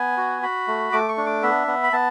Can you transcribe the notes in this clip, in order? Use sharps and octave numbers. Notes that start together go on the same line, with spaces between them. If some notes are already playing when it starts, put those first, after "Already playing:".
Already playing: B3 G#5
F#4
F#4 B5
A3
A3 D6
C#6
D4
D6
B3 E5
B3
B5
B3 A5